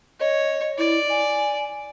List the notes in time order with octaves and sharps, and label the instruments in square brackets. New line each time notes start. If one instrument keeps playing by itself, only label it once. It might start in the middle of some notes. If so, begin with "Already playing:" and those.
[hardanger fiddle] C#5 [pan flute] D#5
[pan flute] E4 [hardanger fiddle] D5
[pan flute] G#5